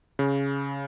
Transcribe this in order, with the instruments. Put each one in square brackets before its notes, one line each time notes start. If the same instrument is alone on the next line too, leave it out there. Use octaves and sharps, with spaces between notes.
[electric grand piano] C#3